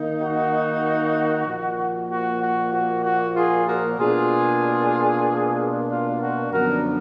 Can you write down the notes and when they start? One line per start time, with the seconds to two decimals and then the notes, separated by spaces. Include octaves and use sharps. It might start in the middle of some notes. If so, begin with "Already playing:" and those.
Already playing: D#3 A#3 D#4
0.20 F#4
1.46 A#2 F3 A#3
2.10 F#4
2.41 F#4
2.73 F#4
3.03 F#4
3.35 F4 G#4
3.67 F#4 A#4
3.98 B2 A#3 D4 F4 G#4
5.89 F4
6.21 F#4
6.52 F#2 D3 F3 B3 D4 F#4 A#4